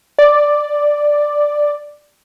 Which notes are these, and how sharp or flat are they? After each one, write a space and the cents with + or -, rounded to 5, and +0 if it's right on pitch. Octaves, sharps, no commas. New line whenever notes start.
D5 +5